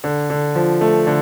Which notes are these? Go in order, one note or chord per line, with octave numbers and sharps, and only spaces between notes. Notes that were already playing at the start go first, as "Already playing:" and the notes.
D3
D3
F3
A3
D3